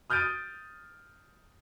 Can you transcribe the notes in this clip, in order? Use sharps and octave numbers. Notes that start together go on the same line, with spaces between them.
D#6 F6 G6 A6 D7 D#7